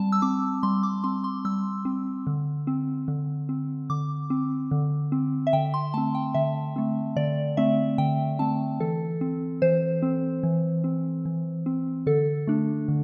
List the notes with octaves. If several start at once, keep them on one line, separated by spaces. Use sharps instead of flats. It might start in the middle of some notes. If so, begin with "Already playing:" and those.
Already playing: G3 C4 A5
E6
C4 D6
G3 C6
D6
C4 C6
C6
G3 E6
C4
D3
C4
D3
C4
D3 D6
C4
D3
C4
E5
D3 G5
C6
A3 C4 A5
G5
D3 E5
A3 C4
D3 D5
A3 C4 E5
D3 G5
A3 C4 A5
E3 A4
C4
E3 C5
C4
E3
C4
E3
C4
D3 A4
A3 D4
D3